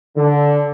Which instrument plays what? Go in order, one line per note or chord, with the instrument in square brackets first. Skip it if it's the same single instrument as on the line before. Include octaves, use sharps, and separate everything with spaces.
[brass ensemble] D3